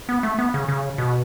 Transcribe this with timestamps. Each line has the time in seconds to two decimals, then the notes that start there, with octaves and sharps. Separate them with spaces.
0.09 B3
0.23 A3
0.39 B3
0.54 C#3
0.68 C#3
0.98 B2